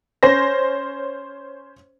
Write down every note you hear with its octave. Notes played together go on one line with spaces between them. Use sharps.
C#4 C5 C#5 A#6